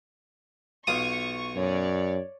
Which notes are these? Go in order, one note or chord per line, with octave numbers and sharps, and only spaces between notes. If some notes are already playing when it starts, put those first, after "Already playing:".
B1 F4 C#6 D#6
F#2 C#5 D5